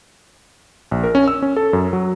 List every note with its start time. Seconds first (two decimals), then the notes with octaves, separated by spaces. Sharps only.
0.91 A#1
1.04 A#4
1.15 C#4
1.28 E6
1.42 C#4
1.56 A4
1.73 F#2
1.93 F#3